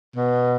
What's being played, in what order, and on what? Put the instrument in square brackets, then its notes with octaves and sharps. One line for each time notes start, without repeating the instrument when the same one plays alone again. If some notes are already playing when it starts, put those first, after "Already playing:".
[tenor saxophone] B2